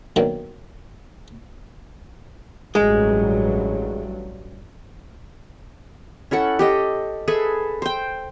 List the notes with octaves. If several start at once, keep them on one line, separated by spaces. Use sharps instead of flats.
B2 D3 D#3 F#3 A#3
A1 G2 F#3 G#3
C#4 E4 A4 F#5
G4 A4 D#5
G#4 A4 B4 E5
C5 G5